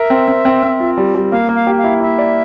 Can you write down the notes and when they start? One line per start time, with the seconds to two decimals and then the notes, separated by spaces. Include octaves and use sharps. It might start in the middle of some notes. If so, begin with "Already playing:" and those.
Already playing: A#4 E5
0.10 C4
0.28 C4
0.45 C4
0.63 C4
0.80 F4
0.98 G3
1.15 G3
1.32 A#3 F5
1.49 A#3
1.55 F5
1.67 G4
1.78 F5
1.84 E4
2.01 E4 E5
2.19 D5